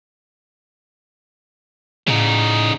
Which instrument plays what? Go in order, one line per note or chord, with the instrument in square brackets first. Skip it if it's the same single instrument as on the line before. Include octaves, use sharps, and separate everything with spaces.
[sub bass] A2 [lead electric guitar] C#3 D#4